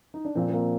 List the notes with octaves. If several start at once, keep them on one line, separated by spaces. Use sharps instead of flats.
D#4
D4
A#2 F3 C4
C4
A#3